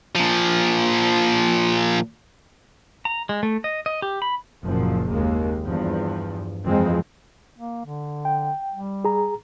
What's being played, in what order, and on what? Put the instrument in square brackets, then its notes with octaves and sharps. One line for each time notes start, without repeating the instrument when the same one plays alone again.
[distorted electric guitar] A#2 F3
[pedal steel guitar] A#5
G#3
A3
D#5
D#5
G4
B5
[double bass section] F#1 F#2 A#2 F3
D#2 G#3 A#3
E2 G2 F3
F2 E3 F3 G#3 C4
[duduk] A#3
D3
[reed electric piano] G5
[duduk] G3
[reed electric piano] G#4 A#5